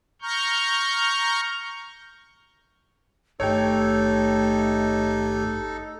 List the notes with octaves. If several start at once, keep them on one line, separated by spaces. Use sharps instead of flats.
A#5 C#6 F6 G6
G#1 G2 A3 D#4 G4 A4 C#5 G5